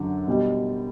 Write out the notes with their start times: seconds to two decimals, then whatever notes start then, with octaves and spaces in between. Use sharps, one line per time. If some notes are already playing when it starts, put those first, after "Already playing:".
Already playing: F#2 D3
0.27 B2 G3